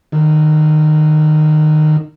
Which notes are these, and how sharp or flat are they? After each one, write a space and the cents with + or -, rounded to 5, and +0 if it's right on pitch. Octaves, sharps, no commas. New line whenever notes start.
D#3 -20